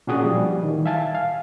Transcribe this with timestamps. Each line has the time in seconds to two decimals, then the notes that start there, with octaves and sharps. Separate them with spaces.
0.07 A#2 C#4 D4 F#4 G#4 D#6
0.23 F3 G3
0.63 D#3 E3
0.86 E5 F5 G#5 A5
1.15 F5